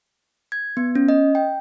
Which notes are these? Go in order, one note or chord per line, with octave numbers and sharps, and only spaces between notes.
G#6
B3
C#4
D#5
G5